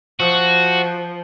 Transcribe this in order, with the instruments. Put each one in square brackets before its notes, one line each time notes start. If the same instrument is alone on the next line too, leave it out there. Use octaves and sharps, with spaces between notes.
[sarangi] F3 [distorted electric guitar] F#4